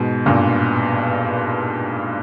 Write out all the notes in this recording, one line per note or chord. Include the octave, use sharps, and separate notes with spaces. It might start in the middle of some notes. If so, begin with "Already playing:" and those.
Already playing: G#2 B2
G2 A#2